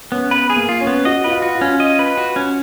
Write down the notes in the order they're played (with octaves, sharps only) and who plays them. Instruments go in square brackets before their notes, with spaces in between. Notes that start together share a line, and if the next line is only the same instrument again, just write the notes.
[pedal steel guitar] B3 [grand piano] C#4
[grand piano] B3 [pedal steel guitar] B4
[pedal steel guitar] G#4
[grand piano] A#3
[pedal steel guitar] F4
[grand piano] C#4
[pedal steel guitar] B3
[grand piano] F#4 [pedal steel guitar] D#5
[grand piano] F#4 [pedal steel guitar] B4
[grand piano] F4
[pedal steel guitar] F#4
[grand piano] F4
[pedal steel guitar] C#4
D#5
B4
F#4
C#4